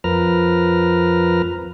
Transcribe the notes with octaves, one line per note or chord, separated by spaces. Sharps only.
F2 F3 A#4 B4 A#5 F6